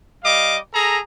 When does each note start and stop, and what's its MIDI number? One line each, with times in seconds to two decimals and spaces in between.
0.24 0.57 55
0.24 0.57 75
0.24 0.57 77
0.24 0.57 86
0.73 0.99 68
0.73 0.99 69
0.73 0.99 82